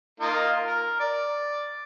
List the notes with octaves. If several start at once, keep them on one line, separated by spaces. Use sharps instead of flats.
A#3 D#4 F4
A#4
D5